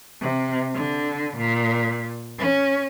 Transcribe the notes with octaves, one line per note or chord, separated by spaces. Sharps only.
C3
D3
A#2
C#4